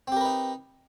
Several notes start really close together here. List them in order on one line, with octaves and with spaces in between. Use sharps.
C4 G4 A#4 B4 D#4